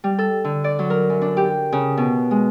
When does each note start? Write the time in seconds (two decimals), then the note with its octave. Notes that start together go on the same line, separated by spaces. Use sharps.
0.04 G3
0.18 A4
0.44 D3
0.64 D5
0.79 F#3
0.90 A#4
1.10 F#2
1.22 D4
1.37 G4
1.72 C#3
1.97 B2
2.31 G#3